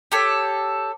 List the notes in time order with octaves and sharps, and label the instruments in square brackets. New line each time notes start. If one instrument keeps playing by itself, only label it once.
[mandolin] G4 A4 C#5